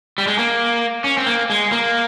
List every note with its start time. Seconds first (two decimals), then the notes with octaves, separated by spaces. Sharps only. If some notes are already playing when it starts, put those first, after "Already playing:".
0.18 G3
0.27 G#3
0.39 A#3
1.04 C#4
1.18 C4
1.26 A#3
1.50 G#3
1.72 A#3